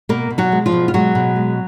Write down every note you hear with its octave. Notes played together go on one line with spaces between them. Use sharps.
B2 A#3 A#4
B2
F#3 F#4
G#3
F3 F4
B2
F4
F#3 G#3 F#4
B2
G#3